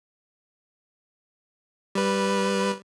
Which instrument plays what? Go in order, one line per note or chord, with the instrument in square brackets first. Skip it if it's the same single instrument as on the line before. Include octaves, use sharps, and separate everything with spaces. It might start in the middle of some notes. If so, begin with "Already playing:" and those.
[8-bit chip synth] G3 B4